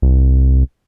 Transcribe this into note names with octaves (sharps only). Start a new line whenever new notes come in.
C2